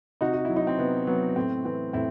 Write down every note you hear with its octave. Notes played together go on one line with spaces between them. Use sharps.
C3 D#4 F#4
F#4
F#3 E4
D#4
C4
C3 B3
F#3 B3
A2 C4
E3 C4
A2 C4 E4